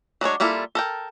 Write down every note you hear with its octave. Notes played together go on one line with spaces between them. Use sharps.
F#3 G#3 D4 C#5
G3 A#3 E4 F4 A4
A4 A#4 G5